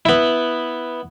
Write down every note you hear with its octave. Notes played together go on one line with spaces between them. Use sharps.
B3 E4